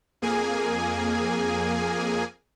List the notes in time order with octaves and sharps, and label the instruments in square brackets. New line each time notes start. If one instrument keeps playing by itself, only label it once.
[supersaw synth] F2 A#3 G#4 G#5